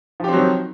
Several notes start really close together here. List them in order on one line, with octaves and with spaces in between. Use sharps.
F3 G4 C4 F#3 D#3